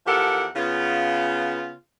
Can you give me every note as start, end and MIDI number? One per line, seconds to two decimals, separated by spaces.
0.07 0.46 40
0.07 0.46 53
0.07 0.46 67
0.07 0.46 69
0.07 0.46 70
0.07 0.46 78
0.56 1.73 49
0.56 1.73 59
0.56 1.73 65